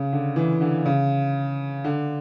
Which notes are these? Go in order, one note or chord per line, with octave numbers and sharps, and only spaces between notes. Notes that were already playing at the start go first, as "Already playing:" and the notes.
Already playing: C#3
D3
E3
D3
C#3
D3